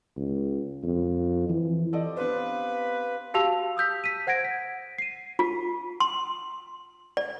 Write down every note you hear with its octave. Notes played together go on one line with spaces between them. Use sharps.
C#2
F2
E3
C4 G4 A4 D5 D#5
B3 D4 F4 G4 B4 C5
F#4 G4 F5 A5 E6 F7
D#6 E6 G6 B6
B6 D#7
C5 F#5 G#6 A#6 D7
B6
C7 D#7
F4
C6
D5